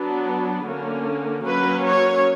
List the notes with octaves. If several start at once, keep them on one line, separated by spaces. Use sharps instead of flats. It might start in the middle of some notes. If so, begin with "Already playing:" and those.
Already playing: F#3 B3 D4
D3 A#3 C#4
F#3 A#3 C#4 B4
C#5